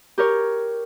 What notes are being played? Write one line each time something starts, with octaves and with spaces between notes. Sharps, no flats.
G4 A#4 C#5